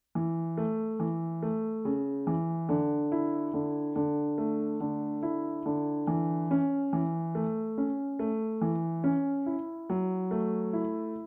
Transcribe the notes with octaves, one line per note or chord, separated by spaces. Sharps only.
E3
A3
E3
A3
C#3
E3
D3
E4
D3
D3
A3
D3
E4
D3
E3
C#4
E3
A3
C#4
A3
E3
C#4
E4
F#3
A3
E4